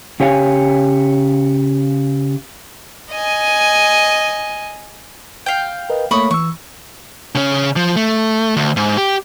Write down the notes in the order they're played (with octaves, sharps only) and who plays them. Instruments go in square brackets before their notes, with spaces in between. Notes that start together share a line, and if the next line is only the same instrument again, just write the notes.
[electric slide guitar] C#3 G4 C#5 F5 G#5
[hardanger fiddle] D#5 G#5
[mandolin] F5 G5
[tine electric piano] A#4 B4 D#5
[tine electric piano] A3 A#3 C#5 [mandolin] B5 C#6 D#6
[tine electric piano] E3 E6 [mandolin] C#6
[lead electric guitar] C#3 C#4
F3
A3
D2
G#2
G4